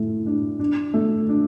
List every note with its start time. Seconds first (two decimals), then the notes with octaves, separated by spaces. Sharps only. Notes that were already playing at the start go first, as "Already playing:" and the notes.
Already playing: A2 A3
0.26 D4
0.59 D4
0.94 A3
1.29 D4